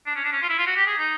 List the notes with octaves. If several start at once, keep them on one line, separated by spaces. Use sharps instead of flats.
D4
C#4
D4
C#4
F4
E4
F4
F#4
G4
G#4
D#4